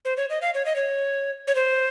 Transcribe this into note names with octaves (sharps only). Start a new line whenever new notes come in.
C5
C#5
D#5
F5
C#5
D#5
C#5
C#5
C5